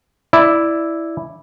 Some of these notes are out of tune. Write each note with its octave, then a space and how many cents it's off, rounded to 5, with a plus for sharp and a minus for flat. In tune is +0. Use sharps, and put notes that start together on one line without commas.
E4 +0 D5 +5